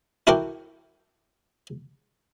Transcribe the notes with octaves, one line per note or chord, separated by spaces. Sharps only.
E4 F#4 A4 A#4 G5 D6